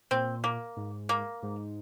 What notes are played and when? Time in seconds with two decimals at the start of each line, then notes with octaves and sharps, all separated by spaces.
0.11 A#2 C4
0.44 A#3
0.77 G#2
1.09 A#3
1.43 G#2